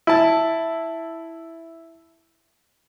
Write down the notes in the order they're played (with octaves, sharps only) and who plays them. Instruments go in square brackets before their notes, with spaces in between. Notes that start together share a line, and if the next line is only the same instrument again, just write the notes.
[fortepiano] E4 A5